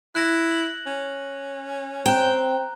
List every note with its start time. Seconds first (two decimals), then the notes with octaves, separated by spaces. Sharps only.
0.15 E4 F#6 A#6
0.51 F#7
0.86 C#4
2.06 C4 G5 A#5 F#6